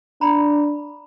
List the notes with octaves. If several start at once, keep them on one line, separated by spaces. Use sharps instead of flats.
D4 A#5 B5